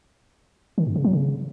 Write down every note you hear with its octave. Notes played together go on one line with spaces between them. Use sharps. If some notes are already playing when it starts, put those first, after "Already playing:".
D#3
G2
C#3
F#3
C#3